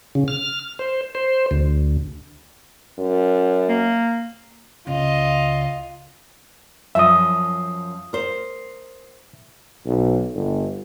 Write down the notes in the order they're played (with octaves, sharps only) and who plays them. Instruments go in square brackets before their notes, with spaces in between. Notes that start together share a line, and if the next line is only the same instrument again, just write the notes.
[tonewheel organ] C#3
F6
C5
C5
D2
[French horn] F#2
[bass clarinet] A#3
[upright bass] C#2 C#3 [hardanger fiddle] F4 D#5
[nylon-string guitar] F#2 F3 [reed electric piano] E5 D#6
[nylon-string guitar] A#4 C5
[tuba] B1
G1